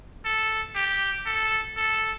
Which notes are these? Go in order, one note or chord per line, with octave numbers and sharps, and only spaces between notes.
A4
G4
A4
A4